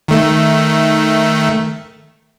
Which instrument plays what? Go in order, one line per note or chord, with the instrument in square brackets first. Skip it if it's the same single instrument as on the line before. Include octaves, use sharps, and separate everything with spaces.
[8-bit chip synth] D#3 A3